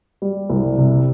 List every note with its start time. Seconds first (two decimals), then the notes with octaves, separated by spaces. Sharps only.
0.22 G3
0.50 C2
0.78 C3